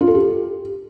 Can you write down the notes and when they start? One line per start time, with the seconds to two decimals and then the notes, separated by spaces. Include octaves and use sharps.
0.01 F4
0.08 A4
0.15 G4